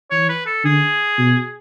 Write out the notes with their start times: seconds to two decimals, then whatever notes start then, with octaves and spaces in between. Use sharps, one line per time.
0.11 E3 C#5
0.29 B4
0.46 A4
0.64 D3 G#4
1.18 B2